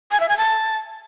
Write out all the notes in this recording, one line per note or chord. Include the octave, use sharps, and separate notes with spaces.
G#5
E5
G#5
A5